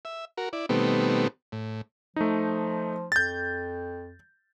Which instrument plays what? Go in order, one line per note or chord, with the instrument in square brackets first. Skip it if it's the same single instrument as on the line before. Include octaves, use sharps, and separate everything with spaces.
[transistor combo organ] E5
F#4 A#4
E4 D5
B2 D#3 G3 A3 B3 C4
A2
[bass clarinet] F3 [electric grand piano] A3 D#4
[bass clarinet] F2 [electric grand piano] G6 A6